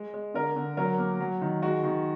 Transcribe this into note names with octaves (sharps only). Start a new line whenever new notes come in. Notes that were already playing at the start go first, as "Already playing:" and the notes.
Already playing: G#3
G#3
D3 A#4
D3
F#3 A#4
A#3
F#3
D#3
G#3 F#4
D#3